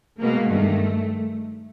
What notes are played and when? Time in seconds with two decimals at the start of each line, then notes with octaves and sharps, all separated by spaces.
0.20 B2 G#3 A#3
0.48 G2 D#3 G#3 A3